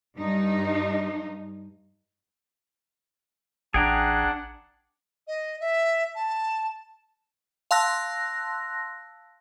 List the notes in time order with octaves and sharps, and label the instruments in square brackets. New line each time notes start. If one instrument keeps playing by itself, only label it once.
[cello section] G2 D#4
[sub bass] A1 [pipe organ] D4 F#5 [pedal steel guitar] G#4 G5 A#5
[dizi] D#5
E5
A5
[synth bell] F5 A5 C6 E6 F#6 A#6